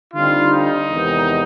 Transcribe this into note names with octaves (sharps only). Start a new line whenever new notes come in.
D3 G3 C4 D#4 F4
D#4
E2 C3 D#3 G#3 B3